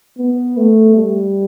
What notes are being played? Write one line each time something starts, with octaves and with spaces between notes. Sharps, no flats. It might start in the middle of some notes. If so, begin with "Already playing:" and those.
B3
A3
G3